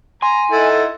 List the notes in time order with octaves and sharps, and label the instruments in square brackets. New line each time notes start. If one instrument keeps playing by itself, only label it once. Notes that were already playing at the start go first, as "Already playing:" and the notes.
[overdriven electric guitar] G#5 [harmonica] A#5 [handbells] C6
[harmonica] D#4 E4 F#5 [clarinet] A4